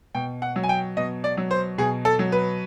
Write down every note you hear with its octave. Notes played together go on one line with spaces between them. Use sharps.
B2 G5
F#5
F#3
G#5
G5
B2 D#5
D5
F#3
C5
B2 G#4
A4
F#3
B4